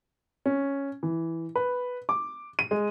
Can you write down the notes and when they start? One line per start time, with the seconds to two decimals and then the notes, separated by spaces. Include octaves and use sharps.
0.46 C#4
1.03 E3
1.55 B4
2.09 D6
2.59 D#7
2.71 G#3